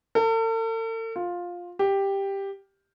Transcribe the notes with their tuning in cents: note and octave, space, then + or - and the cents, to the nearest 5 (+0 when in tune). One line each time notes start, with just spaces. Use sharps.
A4 +45
F4 +10
G4 +5